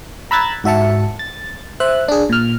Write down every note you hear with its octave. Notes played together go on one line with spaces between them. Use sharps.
A#5 B5 E6 F#6 G#6 A6
G#2 F#4 E5 A5 C#7
A6
C5 E5 F#6
D4 G#4
A#2 F6